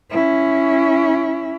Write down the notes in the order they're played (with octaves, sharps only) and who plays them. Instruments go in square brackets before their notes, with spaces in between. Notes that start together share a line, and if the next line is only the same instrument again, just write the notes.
[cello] C#4 E4